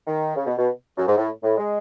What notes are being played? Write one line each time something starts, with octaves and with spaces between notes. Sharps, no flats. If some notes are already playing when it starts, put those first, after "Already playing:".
D#3
C#3
B2
B2
F#2
G#2
A2
A2
G#3